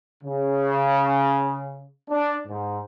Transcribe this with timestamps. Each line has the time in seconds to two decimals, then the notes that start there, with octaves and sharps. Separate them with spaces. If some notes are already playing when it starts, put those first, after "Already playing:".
0.23 C#3
2.09 D4
2.47 G#2